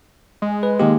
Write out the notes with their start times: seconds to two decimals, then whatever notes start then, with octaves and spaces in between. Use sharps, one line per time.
0.42 G#3
0.63 B4
0.80 D#3 G#3 A#3 G4